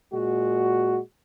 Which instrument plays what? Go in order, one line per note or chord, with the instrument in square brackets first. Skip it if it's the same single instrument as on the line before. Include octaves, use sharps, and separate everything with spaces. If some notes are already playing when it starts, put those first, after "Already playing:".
[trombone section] A#2 G#3 F#4